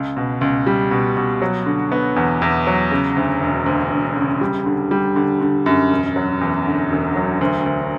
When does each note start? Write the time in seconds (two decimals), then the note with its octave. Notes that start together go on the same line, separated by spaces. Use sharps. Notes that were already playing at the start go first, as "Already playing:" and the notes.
Already playing: C#2
0.17 B2
0.41 C#2
0.67 G3
0.91 B2
1.17 B2
1.42 F#3
1.66 D3
1.92 B3
2.16 E2
2.42 E2
2.67 F#3
2.91 C#3
3.16 D2
3.41 E1
3.66 D2
3.92 E1
4.16 C#3
4.41 G3
4.66 D3
4.91 G3
5.16 D3
5.41 D3
5.66 F#2
5.91 E1
6.16 F#3
6.41 E2
6.66 D3
6.91 E1
7.16 F#3
7.41 D2
7.66 D2